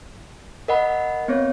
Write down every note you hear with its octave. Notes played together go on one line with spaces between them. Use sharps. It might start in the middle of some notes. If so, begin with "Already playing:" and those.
A#4 D#5 F#5 B5
B3 C4 C#5